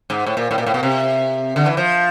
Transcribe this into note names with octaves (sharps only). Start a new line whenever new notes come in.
G#2
A2
A#2
A2
A#2
A2
B2
C3
D3
E3
F3